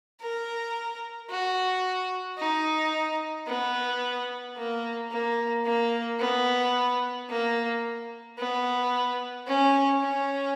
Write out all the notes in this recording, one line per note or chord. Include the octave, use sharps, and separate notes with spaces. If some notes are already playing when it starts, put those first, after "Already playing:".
A#4
F#4
D#4
B3
A#3
A#3
A#3
B3
A#3
B3
C#4
C#4